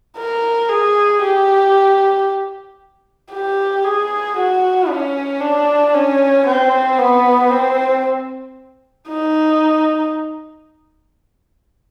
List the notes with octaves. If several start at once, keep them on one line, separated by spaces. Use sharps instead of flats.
A#4
G#4
G4
G4
G#4
F#4
C#4
D4
C#4
C4
B3
C4
D#4